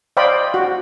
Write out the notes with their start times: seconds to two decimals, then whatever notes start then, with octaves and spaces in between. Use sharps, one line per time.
0.17 C5 D5 D#5 F5 G5 B5
0.54 F#4